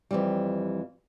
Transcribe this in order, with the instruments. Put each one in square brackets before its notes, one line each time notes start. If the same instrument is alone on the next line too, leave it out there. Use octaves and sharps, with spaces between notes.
[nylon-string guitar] F2 E3 G3